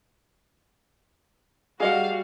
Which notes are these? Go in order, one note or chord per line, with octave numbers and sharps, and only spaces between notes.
G3 F#4 G#4 D#5 F5 F#5